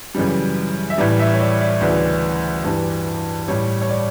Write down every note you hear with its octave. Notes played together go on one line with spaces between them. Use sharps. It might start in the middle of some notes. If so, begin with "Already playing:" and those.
F#2 C#3 E3 G3
E5
A2 E3 G3 D5
E5
C#5
D5
D5
D2 C#3 E3 D5
G2 E3 G3
A2 G3 C#5
C#5
D5